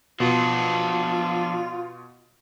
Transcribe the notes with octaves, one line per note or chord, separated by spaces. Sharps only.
B2 F3 D4 F4